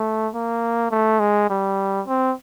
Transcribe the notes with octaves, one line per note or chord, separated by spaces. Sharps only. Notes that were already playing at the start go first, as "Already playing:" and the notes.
Already playing: A3
A#3
A3
G#3
G3
C4